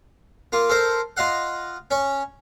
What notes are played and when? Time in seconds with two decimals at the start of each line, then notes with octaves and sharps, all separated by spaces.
0.52 A#3 F4
0.69 A4 A#4 C5
1.17 F4 D#5 F5 F#5
1.91 C#4 C#5